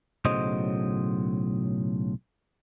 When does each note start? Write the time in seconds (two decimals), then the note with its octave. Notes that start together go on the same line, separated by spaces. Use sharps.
0.25 B1 A2 C#3 F#3 C5 D#5